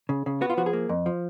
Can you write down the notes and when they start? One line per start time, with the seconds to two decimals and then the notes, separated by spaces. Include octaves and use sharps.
0.09 C#3
0.26 C#3
0.41 B3 F#4
0.50 F4
0.57 F3 F#4
0.66 G#4
0.73 A#3
0.89 F2
1.06 F3